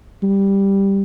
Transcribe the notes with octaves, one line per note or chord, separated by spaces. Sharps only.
G3